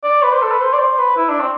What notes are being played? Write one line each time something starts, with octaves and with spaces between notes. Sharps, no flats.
D5
B4
C5
A4
B4
C5
D5
C5
B4
E4
D4
C4